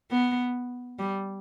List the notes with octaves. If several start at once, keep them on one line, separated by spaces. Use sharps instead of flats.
B3
G3